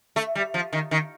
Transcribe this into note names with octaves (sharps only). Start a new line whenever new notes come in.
A3
G3
F3
D#3
D#3